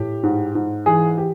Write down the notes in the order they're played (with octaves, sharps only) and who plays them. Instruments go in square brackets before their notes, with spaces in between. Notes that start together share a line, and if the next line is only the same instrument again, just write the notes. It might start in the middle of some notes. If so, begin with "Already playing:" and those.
Already playing: [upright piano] A2 G4
G#2
G#2
E3 G#4
G4